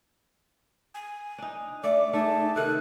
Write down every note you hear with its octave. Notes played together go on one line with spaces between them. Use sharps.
G#5
D4 D#4
A3 D5 D6
A3 D#4 G#4 A5
C3 D#3 A4 F#6